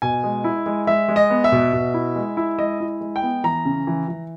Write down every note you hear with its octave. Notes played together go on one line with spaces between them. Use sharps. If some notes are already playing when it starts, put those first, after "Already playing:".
B2 G#5
G#3
E4
G#3
G#3 E5
G#3
D#5
B3
E5
B2
B2
E4
G#3
E4
G#3 D#5
E4
G#3
G5
B3
E3 A#5
C#3
E3
E3